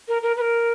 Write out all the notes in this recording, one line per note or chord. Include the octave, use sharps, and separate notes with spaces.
A#4
A#4
B4
A#4